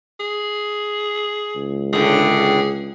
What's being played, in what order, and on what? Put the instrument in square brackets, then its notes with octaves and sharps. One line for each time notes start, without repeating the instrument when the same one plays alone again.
[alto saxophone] G#4
[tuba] C#2
[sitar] A2 D3 [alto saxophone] G#4